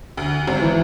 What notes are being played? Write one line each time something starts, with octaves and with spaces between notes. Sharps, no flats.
D2
G#1
E3